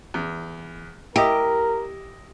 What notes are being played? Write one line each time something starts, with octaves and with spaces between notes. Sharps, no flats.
E2
E4 G4 A#4 D#5